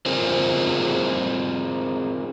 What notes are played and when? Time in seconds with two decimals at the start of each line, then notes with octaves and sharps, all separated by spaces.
0.06 C4 F4 G#4 A#4 C5